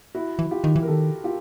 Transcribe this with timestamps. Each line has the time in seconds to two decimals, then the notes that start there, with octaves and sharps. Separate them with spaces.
0.15 E4 F#4
0.39 E3
0.51 F4 G4
0.64 D#3
0.76 E3
0.83 A#4
0.88 D#3 G4 A4
1.24 F4 G4